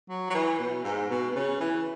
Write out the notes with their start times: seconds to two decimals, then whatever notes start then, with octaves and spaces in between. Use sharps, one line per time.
0.09 F#3
0.30 F#3
0.35 E3
0.59 B2
0.84 G#2
1.10 B2
1.31 B2
1.35 C#3
1.60 E3